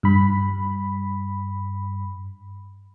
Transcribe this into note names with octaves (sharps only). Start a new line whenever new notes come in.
G2 B5